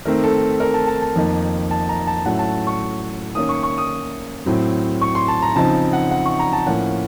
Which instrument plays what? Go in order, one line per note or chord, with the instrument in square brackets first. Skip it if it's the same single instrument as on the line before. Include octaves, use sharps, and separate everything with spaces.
[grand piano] D#3 A3 C4 A#4
A4
A#4
A5
A5
A5
F2 D#3 A#3 D#4
A5
A#5
A5
A2 F#3 A3 C#4 F#5
A5
C#6
D#3 A#3 C#4 D#6
C#6
C#6
D#6
A2 F#3 C4
C#6
C6
A5
A#5
C#3 F3 C4 D#4 A5
F#5
F#5
C#6
A#5
A5
A2 F3 A#3 C#4 F#5